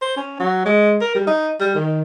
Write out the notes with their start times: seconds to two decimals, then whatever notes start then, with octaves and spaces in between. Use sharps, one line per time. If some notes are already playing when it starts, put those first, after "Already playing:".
0.02 C5
0.17 C#4
0.40 F#3
0.65 G#3
1.01 A#4
1.15 G3
1.27 D#4
1.60 G3
1.75 D#3